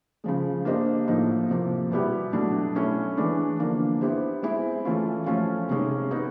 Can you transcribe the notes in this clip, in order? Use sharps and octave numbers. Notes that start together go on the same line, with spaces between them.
C#3 F3 G#3
A#3 D4 G4 C5 D#5
A2 F3 A#3 D#4
C3 F3 A#3
B2 G3 B3 E4 G4
B2 F#3 A3 D4
A3 C#4 E4
E3 G#3 B3 D4
D3 F3 A#3 D4
B3 E4 G4 C5
G#3 C4 E4
E3 A3 C#4 F4
F3 A3 C#4 F4
C3 D#3 G#3 C#4
B3 D#4 G#4